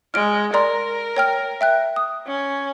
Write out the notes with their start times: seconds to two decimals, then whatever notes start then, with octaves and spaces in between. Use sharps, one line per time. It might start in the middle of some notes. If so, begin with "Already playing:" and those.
0.14 G#3 F6 D7
0.54 A#4 D5 A#5 C6
1.17 C#5 G5 F6
1.61 E5 G5 F#6
1.96 D#6
2.27 C#4